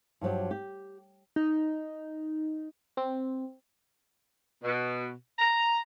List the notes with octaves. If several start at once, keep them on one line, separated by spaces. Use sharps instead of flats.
G2 F3 F#3 G4
G4
D#4
C4
B2
A#5